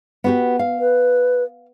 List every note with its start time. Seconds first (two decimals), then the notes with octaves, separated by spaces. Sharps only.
0.24 B3 F#4 G4
0.59 F5
0.79 B4